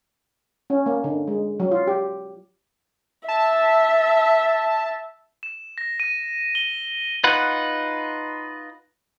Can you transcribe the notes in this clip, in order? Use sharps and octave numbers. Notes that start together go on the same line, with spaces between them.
C#4
A#3
D3
G#3
F#3
F4
G4
E5 A5
E7
A#6
D#7
G7
D#4 F4 B4 F#5